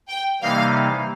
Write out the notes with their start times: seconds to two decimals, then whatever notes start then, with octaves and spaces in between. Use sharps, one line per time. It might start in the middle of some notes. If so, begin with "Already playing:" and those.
0.09 G5
0.42 C3 E3 G3 A#3 D#4 F5